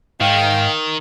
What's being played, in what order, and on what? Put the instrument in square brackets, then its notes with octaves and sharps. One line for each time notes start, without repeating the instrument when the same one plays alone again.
[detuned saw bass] G#2 [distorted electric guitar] D#3 [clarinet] F5 [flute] G5